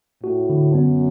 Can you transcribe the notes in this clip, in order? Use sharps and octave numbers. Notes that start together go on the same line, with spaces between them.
A2 F#4
D3
F#2 B3